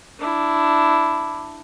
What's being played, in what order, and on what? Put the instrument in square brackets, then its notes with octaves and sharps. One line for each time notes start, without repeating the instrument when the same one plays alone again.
[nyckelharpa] D4 E4